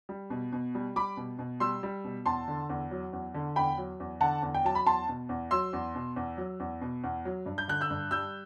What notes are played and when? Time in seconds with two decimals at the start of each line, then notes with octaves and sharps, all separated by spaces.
0.09 G3
0.30 B2
0.53 B2
0.75 G3
0.96 G3 B5 D6
1.17 B2
1.39 B2
1.60 G3 C6 E6
1.83 G3
2.04 B2
2.26 E2 A5 C6
2.48 D3
2.70 E2
2.91 F#3
3.13 E2
3.34 D3
3.56 E2 G5 B5
3.78 F#3
4.00 E2
4.21 D3 F#5 A5
4.43 E2
4.54 G5
4.65 F#3 A5
4.75 B5
4.86 E2 A5 C6
5.08 B2
5.29 E2
5.51 F#3 C6 E6
5.73 E2
5.95 B2
6.16 E2
6.38 F#3
6.60 E2
6.81 B2
7.04 E2
7.25 F#3
7.46 G2
7.58 G6
7.68 D3 F#6
7.81 E6 G6
7.90 G2
8.11 G3 E6 G6